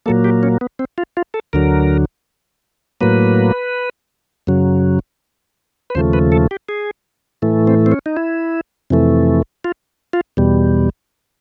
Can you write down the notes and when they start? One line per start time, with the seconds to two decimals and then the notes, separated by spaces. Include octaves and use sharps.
0.06 A#2 F#3 A#3 A4
0.24 G4
0.43 C#4
0.61 B3
0.79 C4
0.98 F4
1.17 F4
1.34 A4
1.53 D2 D3 F#3 A#4
3.01 A2 F#3 A#3 B4
4.47 F#2 C#3 F#3
5.90 B4
5.95 D#2 C#3 F3 A3 C5
6.13 B4
6.32 A4
6.51 G4
6.69 G#4
7.42 A2 E3 A3
7.67 C4
7.86 C4
7.92 C#4
8.06 D#4
8.17 E4
8.90 F2 C3 E3 A3
9.64 F4
10.13 F4
10.37 E2 B2 G3